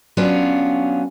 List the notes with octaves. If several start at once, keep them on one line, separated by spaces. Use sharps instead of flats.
F#3 B3 C#4 D4 F4